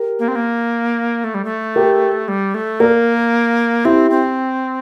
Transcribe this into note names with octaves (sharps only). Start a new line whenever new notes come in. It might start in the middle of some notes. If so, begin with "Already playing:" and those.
Already playing: G4 A#4
A#3
C4
A#3
A3
G3
A3
G4 A#4
G3
A3
A#3 A#4 D5
C4 E4 G4
C4